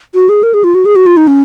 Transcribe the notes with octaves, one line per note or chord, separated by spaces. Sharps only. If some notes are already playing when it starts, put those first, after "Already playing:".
F#4
G#4
A#4
G#4
F4
F#4
G#4
F#4
F4
D#4
C#4